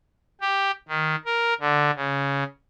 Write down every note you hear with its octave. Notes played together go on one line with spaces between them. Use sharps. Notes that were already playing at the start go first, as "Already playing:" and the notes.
G4
D#3
A#4
D3
C#3